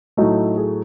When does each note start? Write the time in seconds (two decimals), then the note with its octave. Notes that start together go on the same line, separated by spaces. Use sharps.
0.17 A2 F#3 A3 D#4
0.57 G#4